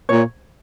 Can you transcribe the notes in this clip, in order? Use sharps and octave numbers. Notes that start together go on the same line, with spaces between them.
A#2 C#5